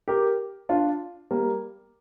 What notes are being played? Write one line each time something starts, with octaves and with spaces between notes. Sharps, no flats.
G4 A#4
D4 F4
G3 A#3